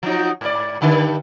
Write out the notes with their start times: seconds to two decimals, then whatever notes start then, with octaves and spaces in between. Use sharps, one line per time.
0.03 F3 F#3 D#4
0.41 G#2 D5
0.81 G2 D3 D#3